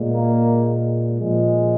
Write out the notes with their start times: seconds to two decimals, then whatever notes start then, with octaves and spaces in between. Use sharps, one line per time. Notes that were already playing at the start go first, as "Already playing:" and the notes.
Already playing: A#2 G#3
0.08 A#3
1.18 A#2 F3 G#3